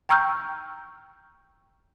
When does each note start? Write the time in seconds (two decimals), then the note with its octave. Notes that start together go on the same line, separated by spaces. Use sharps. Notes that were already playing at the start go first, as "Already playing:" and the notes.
0.09 G5 A#5 C#6 E6 F6 G6